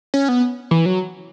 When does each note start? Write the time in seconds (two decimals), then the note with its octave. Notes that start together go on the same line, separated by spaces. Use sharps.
0.14 C#4
0.29 B3
0.71 E3
0.86 F#3